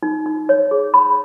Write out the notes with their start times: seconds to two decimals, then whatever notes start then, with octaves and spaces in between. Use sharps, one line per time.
0.03 D#4
0.26 D#4
0.49 C#5
0.71 G#4
0.94 B5